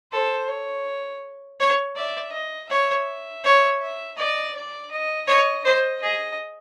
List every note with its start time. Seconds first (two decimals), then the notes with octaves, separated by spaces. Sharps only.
0.12 A4 C5
0.49 C#5
1.60 C#5
1.96 D5 E5
2.32 D#5
2.70 C#5 E5
3.44 C#5
3.80 E5
4.17 D5 D#5
4.54 D5
4.91 D#5
5.28 C#5 D#5
5.65 C5 D#5
6.02 G#4 D#5